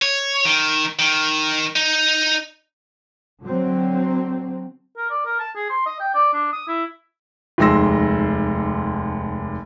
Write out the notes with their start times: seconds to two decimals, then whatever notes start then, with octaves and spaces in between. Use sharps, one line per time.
0.02 C#5
0.45 D#3
0.99 D#3
1.76 D#4
3.43 D3 F#3 C4
4.97 A#4
5.10 D5
5.25 A#4
5.39 A5
5.56 G#4
5.70 C6
5.86 D#5
6.00 G5
6.14 D5
6.33 D4
6.53 D#6
6.68 E4
7.58 F1 D#2 G#3 C6 E6 A#6